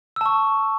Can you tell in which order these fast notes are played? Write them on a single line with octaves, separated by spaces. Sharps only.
E6 A5 C#6